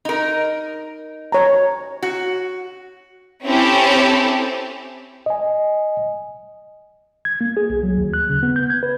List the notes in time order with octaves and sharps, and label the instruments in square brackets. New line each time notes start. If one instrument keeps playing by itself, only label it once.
[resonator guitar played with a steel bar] D#4 A#4
[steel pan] C#5 A#5
[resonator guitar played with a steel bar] F#4
[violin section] C4 C#4 E4 G4 A4
[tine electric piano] D#5 G#5
G#6
A#3
G#4
B1
F#3
D#2
F#6
C#3
B3
G6
G#6
B4